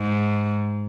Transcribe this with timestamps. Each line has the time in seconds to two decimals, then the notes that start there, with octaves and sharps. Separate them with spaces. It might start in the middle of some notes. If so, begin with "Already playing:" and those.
Already playing: G#2